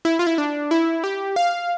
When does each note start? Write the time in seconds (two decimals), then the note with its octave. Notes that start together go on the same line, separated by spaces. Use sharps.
0.05 E4
0.19 F4
0.27 E4
0.38 D4
0.71 E4
1.04 G4
1.36 F5